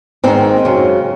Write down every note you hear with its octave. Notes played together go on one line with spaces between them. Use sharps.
G#2 D#3 C4
F#2 C#3